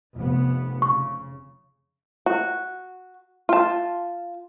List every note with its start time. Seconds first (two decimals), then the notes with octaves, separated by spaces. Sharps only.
0.16 F1 B3
0.82 C#3 C#6
2.26 F#4
3.49 F4 A5